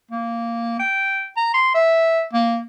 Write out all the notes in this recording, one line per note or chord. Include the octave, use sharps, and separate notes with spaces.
A#3
G5
A#5
C6
E5
A#3